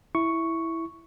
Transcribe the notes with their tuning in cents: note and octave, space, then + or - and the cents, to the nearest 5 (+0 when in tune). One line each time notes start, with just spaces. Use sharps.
E4 +0 C#6 +0